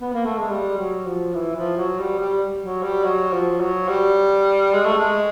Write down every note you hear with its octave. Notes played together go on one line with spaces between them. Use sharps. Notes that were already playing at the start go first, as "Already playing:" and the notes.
B3
A#3
A3
G#3
G3
F#3
F3
E3
F3
F#3
G3
G3
F#3
G3
F#3
F3
F#3
G3
G#3
A3
G#3